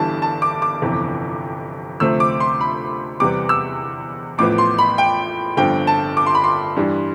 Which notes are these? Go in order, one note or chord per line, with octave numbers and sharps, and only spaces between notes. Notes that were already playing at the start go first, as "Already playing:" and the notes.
Already playing: G1 G2 E3 G3 A5
A5
D6
D6
G1 F2 C3 E3
D2 C3 F3 A3 C4 E6
D6
C6
B5
E2 C3 G3 B3 D6
E6
A1 A2 F3 B3 D6
C6
B5
G5
G1 G2 F3 C4 G5
A5
D6
C6
B5
C6
G2 E3 G3